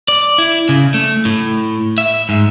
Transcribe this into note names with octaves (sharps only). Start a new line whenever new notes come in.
D5
E4
C#3
A3
A2
E5
G#2